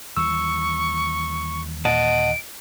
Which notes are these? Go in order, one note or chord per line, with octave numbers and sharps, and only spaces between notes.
D#2 E3 G3 C#6 E6
A#2 D#5 F#5 A5 D7